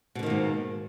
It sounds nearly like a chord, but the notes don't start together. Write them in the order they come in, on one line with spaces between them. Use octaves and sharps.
B2 D3 D#3 A#3 G#2